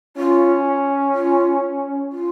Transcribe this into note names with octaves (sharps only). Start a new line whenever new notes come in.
C#4 F4
F4
F4